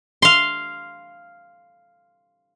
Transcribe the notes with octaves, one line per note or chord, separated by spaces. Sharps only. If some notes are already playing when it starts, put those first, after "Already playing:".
F5 C6